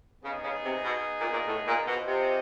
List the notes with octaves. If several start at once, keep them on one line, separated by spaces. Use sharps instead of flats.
C#3 B3 D#4 G#4
C#3
C3
B2
A#2
A#2
A2
A#2
B2 F4 G#4 C5 D#5
C3